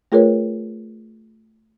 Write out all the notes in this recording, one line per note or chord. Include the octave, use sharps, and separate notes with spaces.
A3 F4 G#4 A#4 B4 C#5